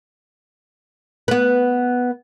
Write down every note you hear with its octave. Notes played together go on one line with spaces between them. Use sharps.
B3 B4